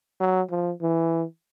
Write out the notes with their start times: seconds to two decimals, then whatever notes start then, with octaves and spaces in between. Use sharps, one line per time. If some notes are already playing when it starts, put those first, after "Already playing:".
0.21 F#3
0.51 F3
0.82 E3